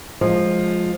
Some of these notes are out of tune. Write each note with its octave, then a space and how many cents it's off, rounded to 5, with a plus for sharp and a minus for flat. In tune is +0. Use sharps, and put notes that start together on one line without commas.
F3 +10 G#3 +0